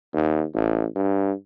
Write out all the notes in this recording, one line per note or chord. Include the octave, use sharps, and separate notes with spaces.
D#2
A1
G2